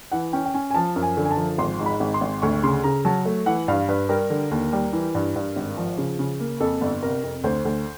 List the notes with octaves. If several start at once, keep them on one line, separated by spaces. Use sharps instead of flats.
E3 F#5
C#4 G5
G5
C#4 G#5
G#5
F3 A5
F#2
G#5
D3
G#5
A5
F3
G#1 C6
G#2
B5
G#1
C6
G#1
D2 C#6
C#3 C6
C#3 A#5
F#3 A5
A3
E3 F#5
G2 F5
G2 B4
G3 A#4
D3
D#2
G3
E3
G2
G2
G#1
F3
C#3
C#3
A#3
F2 A4
G1
C3 A#4
F2
D2 C5
D2